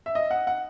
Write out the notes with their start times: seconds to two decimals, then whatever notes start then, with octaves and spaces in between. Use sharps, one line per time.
0.06 E5
0.15 D#5
0.31 F#5
0.47 F#5